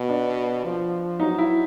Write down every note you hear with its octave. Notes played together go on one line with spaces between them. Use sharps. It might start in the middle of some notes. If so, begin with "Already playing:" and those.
Already playing: B2
D4
F3
F#3 D#4
E4